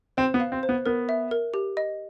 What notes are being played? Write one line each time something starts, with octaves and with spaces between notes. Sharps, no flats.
C4 C5
B3
F5
C4
C5
B3
B3 A#4
E5
A#4
G4
D#5